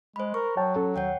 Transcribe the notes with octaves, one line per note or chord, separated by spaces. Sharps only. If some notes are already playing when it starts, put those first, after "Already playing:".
G#3 C5 B5
A#4 C#6
F#3 C#5 G5 A5
C#4 A4
D#2 C#5 F#5 G5